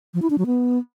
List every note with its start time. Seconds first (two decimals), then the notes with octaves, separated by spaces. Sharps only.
0.14 F3
0.22 E4
0.30 D4
0.38 F#3
0.46 B3